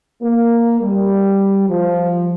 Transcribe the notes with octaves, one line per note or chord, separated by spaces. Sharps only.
A#3
G3
F3